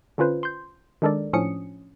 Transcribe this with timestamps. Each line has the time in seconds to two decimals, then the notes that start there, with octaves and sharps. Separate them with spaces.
0.18 D3 C#4 F4 B4 C5
0.43 C6 G6
1.02 D#3 G#3 D4 A4 A#4 D5
1.33 A2 F3 C#4 D4 D#6 C#7